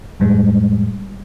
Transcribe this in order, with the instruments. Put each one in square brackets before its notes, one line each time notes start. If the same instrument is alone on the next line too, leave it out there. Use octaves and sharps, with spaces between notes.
[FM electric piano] F2 A2 G3 G#3